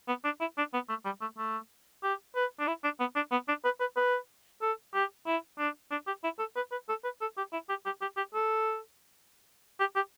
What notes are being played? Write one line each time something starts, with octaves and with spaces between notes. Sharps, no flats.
B3
D4
E4
D4
B3
A3
G3
A3
A3
G4
B4
D4
E4
D4
B3
D4
B3
D4
B4
B4
B4
A4
G4
E4
D4
D4
G4
E4
A4
B4
B4
A4
B4
A4
G4
E4
G4
G4
G4
G4
A4
G4
G4